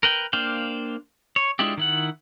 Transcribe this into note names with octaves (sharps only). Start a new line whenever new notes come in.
A#4 B4 G5
A#3 D4 C5 F5 G5
C#5
G#3 D4 E4 F4 G4
D#3 E4 F#5